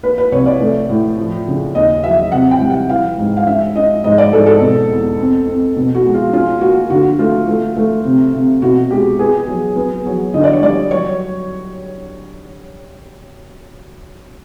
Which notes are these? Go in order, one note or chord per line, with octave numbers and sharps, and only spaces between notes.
A#3 B4
B4
C2 C#5
D5
A3
A2
F3
C#3
D#2 D#5
F#3 E5
C3 F#5
G5
G3
F#5
E3 F5
G#2
F5
C#4 E5
C#4 D#5
G#2 D#5
D5
G#2 A4
A4
B2
E2
C4
C4
B2
F#4
G#3
F4
C#4 F4
A#3 F#4
D3 F#4
A3 F4
A3
A3
C3
C3
B2 F#4
G#3 G4
B3 G#4
F#3
B3
F#3
D3 D#5
D5
C#5
G3 D5
F#3 C#5